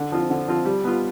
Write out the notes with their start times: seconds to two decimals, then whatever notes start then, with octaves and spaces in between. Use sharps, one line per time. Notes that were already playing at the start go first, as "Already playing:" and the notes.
Already playing: D3
0.12 F3 C4 F4
0.30 D3
0.48 F3 C4 F4
0.65 G3
0.84 B3 F4